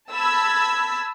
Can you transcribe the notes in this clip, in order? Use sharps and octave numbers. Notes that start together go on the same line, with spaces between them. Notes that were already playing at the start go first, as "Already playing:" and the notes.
A5 B5 E6 G#6